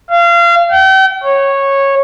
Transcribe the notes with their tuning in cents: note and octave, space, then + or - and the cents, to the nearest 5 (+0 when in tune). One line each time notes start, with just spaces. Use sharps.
F5 -30
G5 -40
C#5 -10